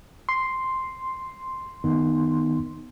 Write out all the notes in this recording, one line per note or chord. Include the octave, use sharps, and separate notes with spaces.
C6
D#3 B3 D#4